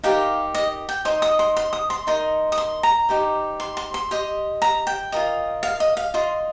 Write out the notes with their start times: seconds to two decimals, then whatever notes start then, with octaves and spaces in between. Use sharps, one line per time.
0.03 D#4 G4 A#4 F5
0.55 D#5
0.89 G5
1.05 D#4 C5 D#5 C6
1.22 D#6
1.39 C6
1.56 C6
1.73 D#6
1.90 C6
2.07 D#4 A#4 D#5 C6
2.52 D#6
2.58 C6
2.83 A#5
3.09 D#4 G4 C5
3.60 C6
3.77 C6
3.94 C6
4.11 G4 D#5 C6
4.62 A#5
4.87 G5
5.12 F4 A#4 D#5
5.63 F5
5.80 D#5
5.97 F5
6.14 F4 D#5 C6